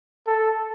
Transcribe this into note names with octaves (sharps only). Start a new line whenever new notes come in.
A4